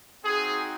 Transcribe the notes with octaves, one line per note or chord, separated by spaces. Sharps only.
C4 D#4 F#4 G#4